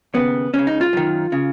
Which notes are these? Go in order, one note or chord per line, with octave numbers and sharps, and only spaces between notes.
D#2 C#3 B3
C#2 C#3 C#4
D#4
F4
F#2 D#3
C#3